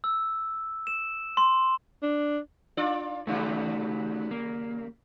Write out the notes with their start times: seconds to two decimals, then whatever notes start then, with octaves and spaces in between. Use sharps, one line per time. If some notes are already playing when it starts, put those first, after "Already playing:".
0.04 E6
0.87 E7
1.37 C6
2.02 D4
2.77 D4 F4 D5
3.27 D#2 C#3 G3 A3 D#4 F#4
4.31 A#3